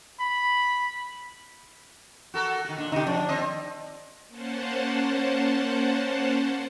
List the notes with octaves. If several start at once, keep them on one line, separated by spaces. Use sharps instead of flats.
B5
F#4 A4 A#4
D#3 F#4
A#2 D4
A#2 D3 D#4 G4
F3 D4
D#2 C4 D#5
A#3 C#4 C5 F#5 A5